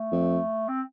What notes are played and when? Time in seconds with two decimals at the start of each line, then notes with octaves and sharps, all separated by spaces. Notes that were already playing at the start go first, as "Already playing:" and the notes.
Already playing: A3
0.12 F2
0.68 C4